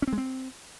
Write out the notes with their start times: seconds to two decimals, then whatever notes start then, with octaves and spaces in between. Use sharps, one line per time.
0.02 C#4
0.07 C4
0.13 G#3
0.18 C4